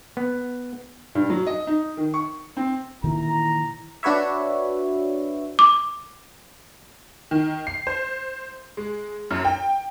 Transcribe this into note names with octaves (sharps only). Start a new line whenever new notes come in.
B3
G2
F#3
D#5
D#4
D#3
C#6
C4
A#2 D#3 E3 E4 A#5
D4 F#4 B4 C#5 E5
D6
D#3
C7
C5
G#3
F#2
G5